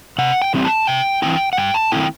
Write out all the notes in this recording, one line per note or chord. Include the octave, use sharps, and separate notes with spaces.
C3 F#5
G5
E3 G3 C4 E4
A5
C3 G5
E3 G3 C4 E4 G5
F#5
G2 G5
A5
D#3 A3 C4 E4 G5